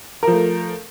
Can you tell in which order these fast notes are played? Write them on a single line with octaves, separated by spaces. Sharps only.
A#4 F3 A3